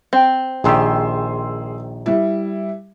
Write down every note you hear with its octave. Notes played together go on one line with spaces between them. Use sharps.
C4
A#1 D#3 G4 G#4 C6 E6
G3 E4